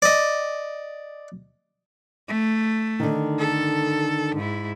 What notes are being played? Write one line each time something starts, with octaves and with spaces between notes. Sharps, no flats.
D5 D#5
A3
D3 D#3
A4
G#2 E4